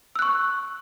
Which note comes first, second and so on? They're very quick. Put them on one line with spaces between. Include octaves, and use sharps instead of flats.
E6 F#6 C#6